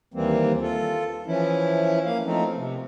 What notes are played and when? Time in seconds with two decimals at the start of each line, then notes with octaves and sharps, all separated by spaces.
0.14 D#2 E3 G3 A#3 C4
0.61 F4 A4
1.27 E3 F3 C#4 E4
2.06 A#3 F5
2.25 F3 A3 C4 D#4
2.56 C3